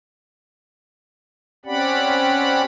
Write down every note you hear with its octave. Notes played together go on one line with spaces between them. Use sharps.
C4 C#4 G4 D5 F#5 B5